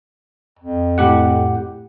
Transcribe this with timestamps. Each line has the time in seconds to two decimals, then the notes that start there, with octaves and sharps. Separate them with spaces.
0.59 F2
0.98 A2 G4 F#5